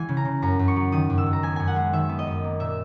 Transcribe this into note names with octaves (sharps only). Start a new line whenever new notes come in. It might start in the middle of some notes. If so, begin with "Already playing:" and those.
Already playing: E3 G#3 G#5
C#3
A#5
C#3
F#2 A#5
F#2
C#6
F#3
D#3 D#6
F#2
E6
F#2
A#5
B3 G#5
F#2 G#5
F#5
G#3
D#3 E5
B3
D#5
F#2
A#3
A#2 E5